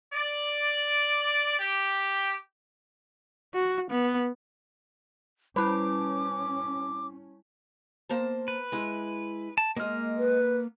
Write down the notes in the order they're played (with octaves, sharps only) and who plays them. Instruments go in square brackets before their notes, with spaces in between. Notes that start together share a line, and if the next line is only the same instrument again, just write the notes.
[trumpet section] D5
G4
[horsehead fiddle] F#4
B3
[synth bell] G3 E4 A5 [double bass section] C#4 [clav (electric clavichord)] B4 [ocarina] D6
[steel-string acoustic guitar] A#3 C5 A5
[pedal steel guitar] B4
[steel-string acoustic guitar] G#3 E4
[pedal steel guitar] A5
[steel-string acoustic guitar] G#3 D#5 [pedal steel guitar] A#3 F6
[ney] B4